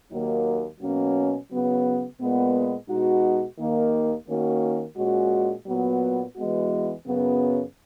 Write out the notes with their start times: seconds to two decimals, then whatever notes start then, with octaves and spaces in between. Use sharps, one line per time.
0.11 D#2 D#3 F#3 A#3
0.80 B2 F#3 A#3 C#4
1.50 C#3 F#3 B3
2.19 A#2 G#3 B3
2.88 B2 G#3 D#4 F#4
3.58 D#2 D#3 A#3
4.27 D#3 A#3 C#4 F#4 A#4
4.97 A#2 G#3 C#4 F#4
5.67 A#2 F#3 B3
6.36 E3 G#3 B3 F#4
7.06 F#2 C#3 F#3 B3